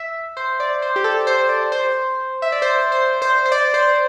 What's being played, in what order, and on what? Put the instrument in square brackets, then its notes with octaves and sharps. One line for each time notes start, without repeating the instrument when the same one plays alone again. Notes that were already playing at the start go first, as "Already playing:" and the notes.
Already playing: [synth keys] E5
C5
D5
C5
G4
A4
C5
D5
C5
E5
D5
C5
C5
C5
C5
D5
C5